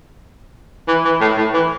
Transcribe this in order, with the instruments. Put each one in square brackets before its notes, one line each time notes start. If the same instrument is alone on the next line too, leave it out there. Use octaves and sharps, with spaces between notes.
[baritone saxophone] E3
E3
A2
A2
E3